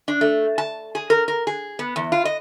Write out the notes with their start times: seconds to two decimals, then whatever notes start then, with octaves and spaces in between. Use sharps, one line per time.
0.08 D4
0.21 A3
0.58 A5
0.95 G#4
1.10 A#4
1.28 A#4
1.47 G#4
1.79 B3
1.96 E2
2.12 F4
2.25 D#5